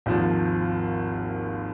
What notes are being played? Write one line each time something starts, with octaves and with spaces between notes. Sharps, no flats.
G#1 D#2 F3